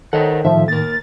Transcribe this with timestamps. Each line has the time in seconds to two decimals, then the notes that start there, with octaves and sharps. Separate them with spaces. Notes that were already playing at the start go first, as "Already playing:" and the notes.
0.13 D#3 A4 C5 C#5 D#5 F#5
0.45 A2 D#3 F3 E5
0.68 D#2 A#4 A6